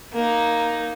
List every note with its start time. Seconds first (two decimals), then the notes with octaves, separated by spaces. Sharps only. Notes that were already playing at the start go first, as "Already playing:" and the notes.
0.13 A#3 D#4